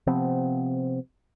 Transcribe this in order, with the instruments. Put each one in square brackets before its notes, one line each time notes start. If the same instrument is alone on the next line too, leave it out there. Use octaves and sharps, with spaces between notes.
[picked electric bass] C3 F3 B3 C4